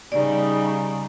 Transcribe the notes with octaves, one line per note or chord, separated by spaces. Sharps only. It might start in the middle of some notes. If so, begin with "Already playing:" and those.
C#3 G3 D#4 D5